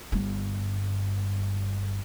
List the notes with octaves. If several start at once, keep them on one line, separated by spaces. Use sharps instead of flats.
G1 G2